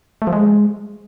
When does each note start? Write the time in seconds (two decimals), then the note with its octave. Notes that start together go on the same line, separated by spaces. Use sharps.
0.22 A3
0.27 F3
0.33 G#3